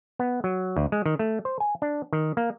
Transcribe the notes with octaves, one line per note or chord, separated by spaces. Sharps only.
B3
F#3
D2
G#3
D#3
A3
C5
G#5
D4
D#3
A#3